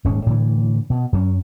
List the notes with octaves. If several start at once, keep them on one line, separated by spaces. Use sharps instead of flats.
D#1 G#2 G#3 C#4
A2 D3 E3
B2
F#2 F#3 C#4